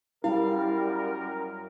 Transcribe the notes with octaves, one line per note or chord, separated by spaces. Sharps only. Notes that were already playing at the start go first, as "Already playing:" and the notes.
F#2 G3 E4 A#4 F5